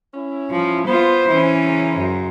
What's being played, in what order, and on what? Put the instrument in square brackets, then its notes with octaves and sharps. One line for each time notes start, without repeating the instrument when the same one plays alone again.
[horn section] C#4 E4
[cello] F3
[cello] B3 F4 [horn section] C5
[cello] E3 C#4
[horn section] C#3 C5 A#5
[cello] F#2